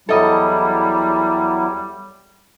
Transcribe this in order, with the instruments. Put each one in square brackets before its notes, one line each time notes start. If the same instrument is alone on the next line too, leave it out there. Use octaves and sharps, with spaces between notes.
[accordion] E2 F#3 E4 [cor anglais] G3 [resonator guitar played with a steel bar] A4 D#5